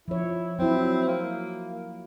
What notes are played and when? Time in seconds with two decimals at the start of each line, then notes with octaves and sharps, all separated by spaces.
0.08 F3 E4 C#5
0.59 F#3 C4 E4
1.08 A#3